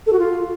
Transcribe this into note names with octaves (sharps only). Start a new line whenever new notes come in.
A4
F#4
F4